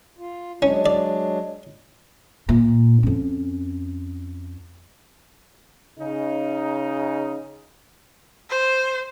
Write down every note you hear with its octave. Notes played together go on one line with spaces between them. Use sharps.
F4
F#3 G#3 C#4 D4
D5
A#2
F2 C#4
C#3 D#4
C5